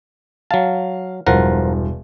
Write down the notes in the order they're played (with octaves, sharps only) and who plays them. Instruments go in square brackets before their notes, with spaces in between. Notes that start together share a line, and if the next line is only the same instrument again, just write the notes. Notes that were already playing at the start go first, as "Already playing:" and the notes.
[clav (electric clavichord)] F#3 A5 [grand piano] F5
[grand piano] E1 G2 [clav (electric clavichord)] F3 A#4 F#5